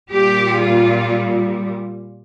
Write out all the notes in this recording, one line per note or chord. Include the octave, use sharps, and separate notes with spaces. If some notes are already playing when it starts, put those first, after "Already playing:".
A#2 G3 G4
F4